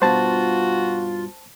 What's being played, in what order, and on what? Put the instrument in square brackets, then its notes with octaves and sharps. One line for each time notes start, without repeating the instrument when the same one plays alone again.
[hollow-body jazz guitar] G2 B2 [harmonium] F4 [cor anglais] F#4 [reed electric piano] C5 A5